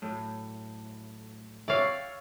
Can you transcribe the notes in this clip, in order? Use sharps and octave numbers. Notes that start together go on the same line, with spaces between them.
A2 F#3
C#5 D5 E5 F5 G5 C#6